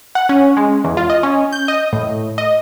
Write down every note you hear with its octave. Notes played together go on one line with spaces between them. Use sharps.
F#5
C#4
G#3
E2
F4
D#5
C#4
G6
D#5
A2
D#5